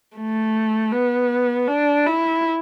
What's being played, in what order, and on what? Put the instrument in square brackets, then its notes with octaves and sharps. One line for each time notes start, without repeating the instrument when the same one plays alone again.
[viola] A3
B3
D4
E4